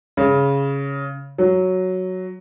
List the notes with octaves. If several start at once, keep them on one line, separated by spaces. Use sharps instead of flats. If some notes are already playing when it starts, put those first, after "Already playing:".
C#3
F#3